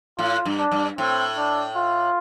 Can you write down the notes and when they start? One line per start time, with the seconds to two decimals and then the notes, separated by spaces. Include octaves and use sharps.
0.18 A2 F4
0.45 G2
0.59 D4
0.72 G2
0.98 A2 C4
1.37 D4
1.77 F4